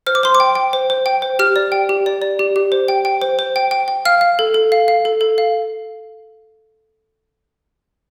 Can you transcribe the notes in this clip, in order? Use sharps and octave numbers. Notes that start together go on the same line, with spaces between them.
C5 F6
D6
C5 C6
D6
G5
G5
C5
C5
G5
C5
G4 F6
D5
G5
G4
D5
D5
G4
G4
C5
G5
G5
C5
C5
G5
G5
G5
F5 F6
F5
A4
A4
F5
F5
A4
A4
F5